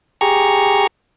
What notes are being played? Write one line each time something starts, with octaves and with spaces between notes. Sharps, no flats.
G4 G#4 A#5 C#6